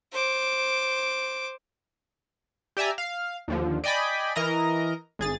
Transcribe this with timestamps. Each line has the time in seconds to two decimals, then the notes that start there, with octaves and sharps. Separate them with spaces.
0.12 C5 D6
2.77 G4 D5 E5 G#5 A#5
2.98 F5
3.48 D#2 D3 F3
3.84 D5 D#5 G5 G#5 B5
4.35 E3 A#4 D#5 A#5 A#6
5.19 G#1 G#4 A6